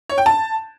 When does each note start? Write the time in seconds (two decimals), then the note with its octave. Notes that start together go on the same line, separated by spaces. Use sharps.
0.09 C#5
0.18 G5
0.26 A5